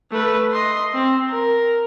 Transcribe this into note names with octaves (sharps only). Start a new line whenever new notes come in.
A3 B4
D#5 C6
C4
A#4